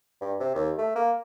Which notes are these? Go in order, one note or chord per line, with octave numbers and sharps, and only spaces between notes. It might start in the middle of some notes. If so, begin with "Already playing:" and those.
G2
C3
D#2
A3
A#3